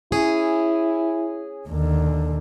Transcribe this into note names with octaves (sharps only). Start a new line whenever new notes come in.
C#4 E4 G#4
D#2 D3